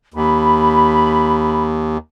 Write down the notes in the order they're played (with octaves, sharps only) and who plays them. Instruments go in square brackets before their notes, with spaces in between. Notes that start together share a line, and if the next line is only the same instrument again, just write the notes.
[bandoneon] D#2 [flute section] B5